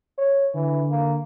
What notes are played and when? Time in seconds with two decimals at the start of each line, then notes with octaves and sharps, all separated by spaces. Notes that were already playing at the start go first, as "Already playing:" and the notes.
0.18 C#5
0.55 D3 E3
0.90 A#3